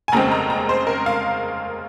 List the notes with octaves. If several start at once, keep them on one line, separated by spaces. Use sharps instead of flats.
G#5
F1 D#2 C#3 G#3 C4 A#5
A#5
A#5
C5
A#4
F5